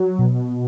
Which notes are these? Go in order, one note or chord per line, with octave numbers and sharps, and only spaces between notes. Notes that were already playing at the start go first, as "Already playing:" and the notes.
Already playing: F#3
B2